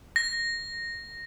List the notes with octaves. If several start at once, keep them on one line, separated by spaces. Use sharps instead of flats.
A#6